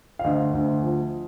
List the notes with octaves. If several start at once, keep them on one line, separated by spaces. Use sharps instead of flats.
F5
D2 D#5
D2
F3